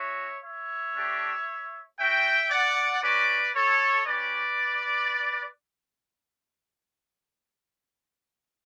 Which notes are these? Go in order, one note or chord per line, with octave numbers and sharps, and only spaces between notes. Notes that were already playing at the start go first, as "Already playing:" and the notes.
Already playing: C#4 F#4 C#5 E5
C#5 E5
A3 D4 G4
C#4 F#4 E5 G5
D5 F#5
C#4 F#4 B4 D5
A4 C#5
C#4 G4 B4 D5